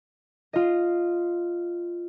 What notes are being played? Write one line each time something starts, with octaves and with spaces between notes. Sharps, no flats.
F4 D#5